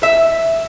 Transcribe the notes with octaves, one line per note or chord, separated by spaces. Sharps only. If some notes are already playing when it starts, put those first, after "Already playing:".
E5